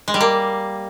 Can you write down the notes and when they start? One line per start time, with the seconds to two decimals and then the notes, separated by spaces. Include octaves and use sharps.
0.08 G#3
0.14 G3
0.21 A#3